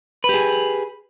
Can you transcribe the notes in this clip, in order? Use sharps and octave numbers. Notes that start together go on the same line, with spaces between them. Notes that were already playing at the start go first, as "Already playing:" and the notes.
G4 G#4 B4